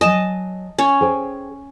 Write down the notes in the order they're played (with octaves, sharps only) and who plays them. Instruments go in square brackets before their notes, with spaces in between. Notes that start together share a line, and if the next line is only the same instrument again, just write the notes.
[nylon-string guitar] F#3 G#5 [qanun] D#5 A5
[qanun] C#4 C#5
[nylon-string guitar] G#4 C5 G5